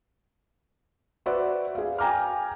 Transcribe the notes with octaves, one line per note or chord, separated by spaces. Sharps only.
F#4 B4 C5 D5 E5
G#4 F5
G5 G#5 A#5 D6 F6